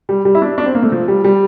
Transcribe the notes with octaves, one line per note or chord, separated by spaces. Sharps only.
G3
G3
E4
D4
D4
C4
A#3
A3
F3
G3
G3